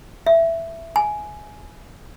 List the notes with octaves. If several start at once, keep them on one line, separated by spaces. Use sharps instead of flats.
E5
G#5